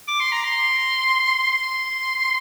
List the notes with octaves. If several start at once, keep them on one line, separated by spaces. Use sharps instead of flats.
D6
C6
A#5
C6
C6